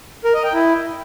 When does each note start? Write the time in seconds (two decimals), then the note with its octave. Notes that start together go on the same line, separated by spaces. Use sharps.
0.24 A#4
0.34 D#5
0.44 G5
0.54 E4